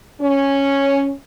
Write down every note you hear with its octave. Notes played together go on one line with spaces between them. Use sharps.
C#4